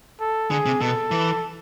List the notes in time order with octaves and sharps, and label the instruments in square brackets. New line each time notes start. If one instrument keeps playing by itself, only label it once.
[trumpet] A4
[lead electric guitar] D3 [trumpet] G#4
[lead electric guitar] C3
[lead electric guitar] B2 [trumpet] A4
[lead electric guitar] E3